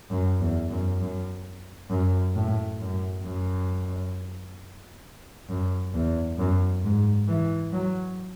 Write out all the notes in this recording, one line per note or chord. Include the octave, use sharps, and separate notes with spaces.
F#2
E2
F#2
F#2
F#2
A2
F#2
F#2
F#2
E2
F#2
G#2
E3
F#3